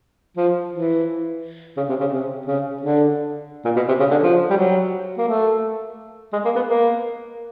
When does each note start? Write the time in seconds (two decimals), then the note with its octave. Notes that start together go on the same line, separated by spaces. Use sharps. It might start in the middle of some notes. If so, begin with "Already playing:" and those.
0.37 F3
0.72 E3
1.77 C#3
1.89 C3
2.00 C#3
2.13 C3
2.47 C#3
2.83 D3
3.65 A#2
3.76 B2
3.88 C3
4.00 C#3
4.11 D3
4.23 F3
4.50 G3
4.57 F#3
5.18 A#3
5.28 A3
6.33 G#3
6.45 A#3
6.56 B3
6.67 A#3